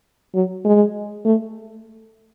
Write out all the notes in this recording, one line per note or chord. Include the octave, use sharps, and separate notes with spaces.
F#3
G#3
A3